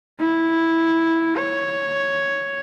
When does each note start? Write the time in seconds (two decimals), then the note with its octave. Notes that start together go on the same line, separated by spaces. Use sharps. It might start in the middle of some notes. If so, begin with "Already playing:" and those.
0.20 E4
1.37 C#5